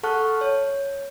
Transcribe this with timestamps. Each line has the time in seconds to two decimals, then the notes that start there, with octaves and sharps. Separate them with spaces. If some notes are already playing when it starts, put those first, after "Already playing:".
0.03 A4 F#5 A5 C#6 F6 F#6
0.41 C#5